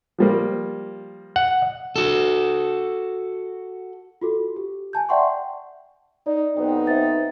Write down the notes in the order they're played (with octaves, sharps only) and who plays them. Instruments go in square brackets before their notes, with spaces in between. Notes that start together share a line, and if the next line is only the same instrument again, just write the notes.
[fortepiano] F3 G3 A#3
[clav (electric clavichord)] F#5
[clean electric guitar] F#4 A4
[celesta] F4 F#4 A4
G4
G#5 A5 G6
D5 E5 F#5 G5 C6 C#6
[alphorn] D#4 [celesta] D5
[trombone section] B1 B3 C4 [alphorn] D#4
[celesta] C5 E5 A6